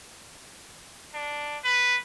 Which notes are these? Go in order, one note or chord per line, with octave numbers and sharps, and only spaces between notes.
D4
B4